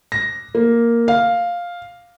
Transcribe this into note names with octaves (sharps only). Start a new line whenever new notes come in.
A#6
A#3
F5